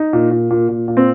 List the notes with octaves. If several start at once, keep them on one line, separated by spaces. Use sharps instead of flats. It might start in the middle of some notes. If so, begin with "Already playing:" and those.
Already playing: D#4
A#2
A#2
A#2
A#2
A#2
C4